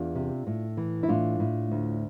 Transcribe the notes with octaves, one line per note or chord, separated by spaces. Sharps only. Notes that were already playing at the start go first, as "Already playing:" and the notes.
Already playing: E2 D4 F4
C3
A2
E3
E4
A2 D4 F4
A2
D2